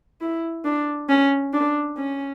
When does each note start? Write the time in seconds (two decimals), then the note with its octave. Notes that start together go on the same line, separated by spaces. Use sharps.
0.21 E4
0.65 D4
1.09 C#4
1.53 D4
1.97 C#4